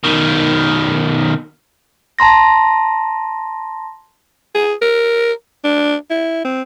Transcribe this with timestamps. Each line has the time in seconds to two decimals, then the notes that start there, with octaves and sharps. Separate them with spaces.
0.04 B2 D#3
2.19 A5 A#5 C6 A#6
4.55 G#4
4.82 A#4
5.64 D4
6.10 E4
6.45 C4